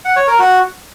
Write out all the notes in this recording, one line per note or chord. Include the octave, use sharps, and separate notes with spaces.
F#5
C#5
A#4
F#4